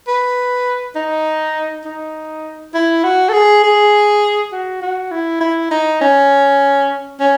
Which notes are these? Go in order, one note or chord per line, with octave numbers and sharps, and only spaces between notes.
B4
D#4
D#4
E4
F#4
A4
G#4
G#4
F#4
F#4
E4
E4
D#4
C#4
C#4